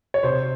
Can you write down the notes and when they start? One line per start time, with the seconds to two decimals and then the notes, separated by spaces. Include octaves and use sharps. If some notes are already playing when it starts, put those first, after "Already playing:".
0.14 C#5
0.23 C3 C5